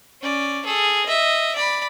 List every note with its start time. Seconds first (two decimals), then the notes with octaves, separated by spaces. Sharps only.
0.21 C#4 D5
0.65 G#4 A4
1.06 D#5 E5
1.55 D5 B5